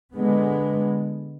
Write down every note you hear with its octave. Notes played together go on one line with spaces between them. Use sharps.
D3 G#3 B3